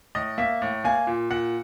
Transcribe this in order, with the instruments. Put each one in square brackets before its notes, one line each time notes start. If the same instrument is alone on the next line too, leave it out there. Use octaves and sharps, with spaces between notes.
[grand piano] A2 D#5
A#3 E5
A2
A#3 G#5
A#2
A#2 F#5